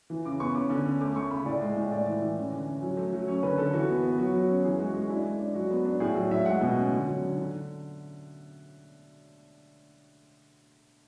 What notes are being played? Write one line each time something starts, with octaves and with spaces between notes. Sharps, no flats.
E3
C#3 D6
B3 C#6
C#4 D6
D3
C#4
A3 D6
A3 C#6
C#3 B5
A2 D5
G#3
A2
A3 D5
E3
E3
C#4
D3
C#4
F#3
A3
F#3
C#4 C#5
D3 B4
D3 A4
E3 F#4
B3
B3
F#3 F#4
F#3
C#4
E3 G#4
G#3 F#4
G#3 F#4
D4 E4
G#3
D4
F#3 F#4
B3
D4
A2 G#4
F#3
A2 E5
G#3 F#5
B2
C#4
D3
F#3
D3
D3